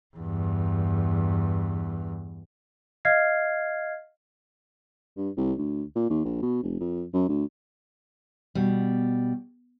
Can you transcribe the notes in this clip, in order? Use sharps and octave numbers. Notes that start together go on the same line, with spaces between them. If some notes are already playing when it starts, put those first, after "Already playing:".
E2 G2
D#5 F5 F6 G#6 C7
G2
C2
D2
A#2
D#2
A#1
B2
F1
F2
F#2
D2
B2 G3